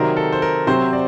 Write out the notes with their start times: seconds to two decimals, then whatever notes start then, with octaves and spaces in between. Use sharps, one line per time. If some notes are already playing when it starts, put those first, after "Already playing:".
Already playing: C3 D#3 F#3 A#4 C5 D5
0.17 A4
0.33 C5
0.42 A#4
0.67 C3 F#3 C4 F#4 C5
0.93 D5